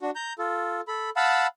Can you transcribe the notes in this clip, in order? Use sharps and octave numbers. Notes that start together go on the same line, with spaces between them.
D4 F#4
A#5 G6
F4 A4
A4 B5
F5 F#5 A5 B5 E6